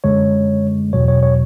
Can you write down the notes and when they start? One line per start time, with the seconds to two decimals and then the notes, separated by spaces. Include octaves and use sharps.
0.04 F#2 D3 G#3 C#5
0.93 E2 B2 F#3 C#5
1.08 C#5
1.23 C#5